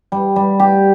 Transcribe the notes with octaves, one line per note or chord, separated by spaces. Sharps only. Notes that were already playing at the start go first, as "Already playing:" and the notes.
G3
G3
G4